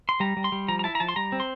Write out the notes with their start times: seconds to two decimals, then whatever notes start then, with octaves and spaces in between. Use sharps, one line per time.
0.09 C6
0.20 G3 A#5
0.37 G3
0.44 C6
0.52 G3
0.68 F3 A#5
0.79 A#5
0.84 E4 A5
0.95 A#5
1.00 F3 A5
1.09 C6
1.16 G3 A#5
1.32 C4
1.40 C6